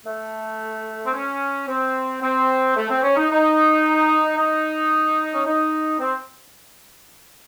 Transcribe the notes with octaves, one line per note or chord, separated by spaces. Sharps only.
A3
C4
C#4
C4
C4
A3
C4
C#4
D#4
D#4
D#4
C#4
D#4
C4